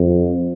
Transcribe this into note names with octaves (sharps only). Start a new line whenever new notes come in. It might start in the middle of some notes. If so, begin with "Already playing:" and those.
Already playing: F2